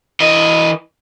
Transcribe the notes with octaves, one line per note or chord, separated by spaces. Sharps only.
E3 D#5